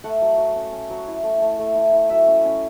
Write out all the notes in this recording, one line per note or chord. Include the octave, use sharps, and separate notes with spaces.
A3 F#5
F#3
F#3
C#4
C#4
F#3
E4
A3
A3
A3
E4
E4
F#3 E5
C#4
C#4